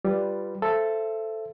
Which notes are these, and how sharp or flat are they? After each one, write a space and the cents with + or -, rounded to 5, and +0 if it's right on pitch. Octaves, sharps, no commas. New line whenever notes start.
G3 +0 F4 -15 B4 +0
A4 +0 C5 +0 E5 +30